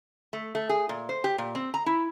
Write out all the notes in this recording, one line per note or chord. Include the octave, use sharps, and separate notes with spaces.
A3
A3
G#4
A#2
C5
G4
A#2
C4
A#5
E4